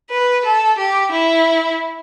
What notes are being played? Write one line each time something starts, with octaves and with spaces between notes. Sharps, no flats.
B4
A4
G4
E4